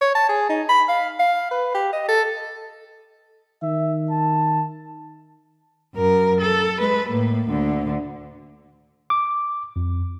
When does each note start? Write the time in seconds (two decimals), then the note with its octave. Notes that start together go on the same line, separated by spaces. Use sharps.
0.01 C#5
0.15 A5
0.29 G#4
0.49 D#4
0.69 B5
0.89 F5
1.19 F5
1.51 B4
1.75 G4
1.93 D#5
2.08 A4
3.63 D#3 E5
4.11 A5
5.95 F#2 A#4
6.41 A4
6.78 G#3 B4
7.09 A2 A#3
7.49 D2 D3
9.10 D6
9.76 F2